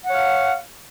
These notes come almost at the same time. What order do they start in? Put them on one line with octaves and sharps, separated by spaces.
F#5 C#5 F5